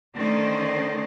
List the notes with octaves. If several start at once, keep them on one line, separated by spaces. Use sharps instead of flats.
D3 D#3 A3 C#4 C5 D5